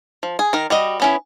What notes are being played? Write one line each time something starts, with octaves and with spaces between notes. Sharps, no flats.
F3
G#4
D#3 A#4
G3 F#4 D#5
B3 C#4 E4